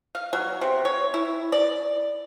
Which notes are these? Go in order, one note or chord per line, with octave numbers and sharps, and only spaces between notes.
F5
F#3
C3
C#5
E4
D5